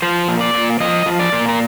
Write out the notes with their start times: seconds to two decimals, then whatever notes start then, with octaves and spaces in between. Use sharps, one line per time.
0.02 F3 C5
0.28 A#2
0.41 D5
0.54 A#2
0.80 F3 D#5
1.06 F3
1.19 D5
1.33 A#2
1.49 A#4